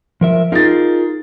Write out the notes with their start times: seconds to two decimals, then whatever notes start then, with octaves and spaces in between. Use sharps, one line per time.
0.21 F3 A#4 E5
0.52 D#4 F4 G#4 A#4 A6